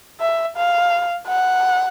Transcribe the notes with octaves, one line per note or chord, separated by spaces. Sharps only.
E5
F5
F#5